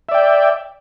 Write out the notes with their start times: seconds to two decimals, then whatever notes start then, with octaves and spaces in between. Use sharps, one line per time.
0.09 E5
0.11 D5
0.14 G5